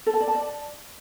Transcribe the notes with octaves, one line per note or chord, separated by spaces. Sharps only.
A4
A5
D5
A5
D5